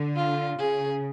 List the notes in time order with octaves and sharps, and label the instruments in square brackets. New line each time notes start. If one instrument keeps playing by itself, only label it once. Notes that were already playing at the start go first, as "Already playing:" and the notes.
Already playing: [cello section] D3
[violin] F4
[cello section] C#3 [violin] G#4